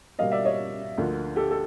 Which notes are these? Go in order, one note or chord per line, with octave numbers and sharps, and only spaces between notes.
B2 G3 A#3 D#5 F5
D5 E5
C#5 D#5
D2 D3 F3 A#3
G4 A4
A4